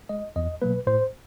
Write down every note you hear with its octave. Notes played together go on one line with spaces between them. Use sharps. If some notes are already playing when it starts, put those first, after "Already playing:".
G#3 D#5
E2 D#5
B2 F#3 A#3 B4
A2 C5